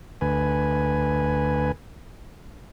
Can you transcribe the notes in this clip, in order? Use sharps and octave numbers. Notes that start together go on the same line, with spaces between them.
D2 B4 G#5